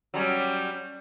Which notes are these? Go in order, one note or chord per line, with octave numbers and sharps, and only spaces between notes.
F#3 G3 C#4